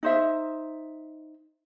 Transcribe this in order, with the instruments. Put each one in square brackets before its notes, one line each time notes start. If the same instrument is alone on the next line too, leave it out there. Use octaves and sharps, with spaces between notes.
[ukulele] D#4 C5 E5